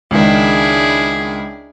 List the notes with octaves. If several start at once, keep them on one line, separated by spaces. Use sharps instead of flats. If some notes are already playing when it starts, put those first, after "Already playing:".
C#2 D#3 D4 E4 G#4